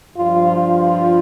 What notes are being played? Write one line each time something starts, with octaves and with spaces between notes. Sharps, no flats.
G2 F3 F4
F4